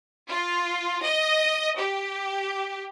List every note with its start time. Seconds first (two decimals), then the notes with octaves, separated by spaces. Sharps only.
0.29 F4
1.03 D#5
1.78 G4